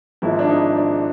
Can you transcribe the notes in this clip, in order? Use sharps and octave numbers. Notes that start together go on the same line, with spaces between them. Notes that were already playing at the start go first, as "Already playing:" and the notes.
G#1 G#2 F3 E4
D4
D#4
D4